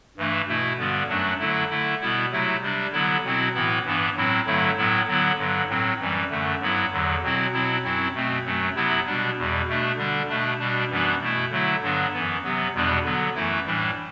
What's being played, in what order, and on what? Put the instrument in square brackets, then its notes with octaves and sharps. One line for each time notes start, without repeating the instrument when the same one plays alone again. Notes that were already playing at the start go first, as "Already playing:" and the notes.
[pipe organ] G2 E3 A3 D4
B2 A3 E4
G2 D3 G3 B3
F#2 F#3 A3 D4
D3 F#3 A3 E4
D3 A3 E4
B2 G3 B3 E4
C3 F#3 A3 E4
C3 G3 D4
D3 F#3 B3 E4
B2 F#3 C4 E4
A2 E3 B3 E4
G2 E3 B3 D4
A2 F#3 C4 E4
G2 D3 F#3 A3 E4
A2 F#3 B3 E4
D3 F#3 B3 E4
G2 D3 F#3
A2 F#3 C4
F#2 E3 G3
F#2 D3 A3
G2 F#3 B3 E4
E2 D3 F#3
B2 F#3 C4 E4
B2 F#3 C4 E4
F#2 F#3 C4 E4
B2 A3 C4
F#2 F#3 A3
C3 F#3 B3 E4
B2 G3 D4
E2 B2 G3
B2 A3 D4
D3 G3 D4
B2 A3 D4
B2 G3 D4
F#2 E3 G3 B3 D4
B2 A3 E4
D3 F#3 A3 E4
G2 D3 F#3 B3 D4
F#2 E3 B3
C3 F#3 B3
E2 B2 G3 B3 D4
D3 F#3 B3
F#2 E3 A3 E4
A2 E3 G3 D4